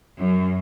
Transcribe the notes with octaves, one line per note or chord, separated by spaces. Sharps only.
F#2